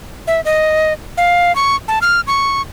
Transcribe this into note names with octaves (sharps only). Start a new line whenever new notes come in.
E5
D#5
F5
C#6
A5
F6
C#6